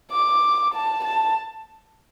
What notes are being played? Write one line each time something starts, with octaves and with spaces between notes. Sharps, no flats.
D6
A5
A5